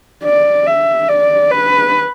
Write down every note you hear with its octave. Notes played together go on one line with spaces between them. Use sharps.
D5
E5
D5
B4